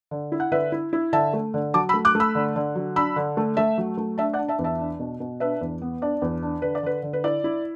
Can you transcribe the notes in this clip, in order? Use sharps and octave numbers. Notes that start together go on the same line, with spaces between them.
D3
E4
F#5
D3 B4 E5
E4
E4
D3 E5 A5
A3
D3
F#3 A5 D6
B5 E6
A3
D6 F#6
A3
B5 E6
D3
D3
F#3
D4 B5 E6
D3
A3
A3 E5 A5
F#3
A3
D4 E5 A5
D5 F#5
D4
E5 A5
E2
E5 A5
D4
B2
B2
D4 B4 E5
E2
B3
D4 D5
E2
D4
D3 B4
D5
D3 B4
D3
B4
E4 D5
E4